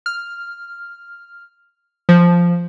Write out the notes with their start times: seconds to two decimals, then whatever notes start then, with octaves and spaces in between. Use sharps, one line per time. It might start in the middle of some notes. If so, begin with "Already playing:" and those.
0.06 F6
2.09 F3